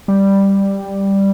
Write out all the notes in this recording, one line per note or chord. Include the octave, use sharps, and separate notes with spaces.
G3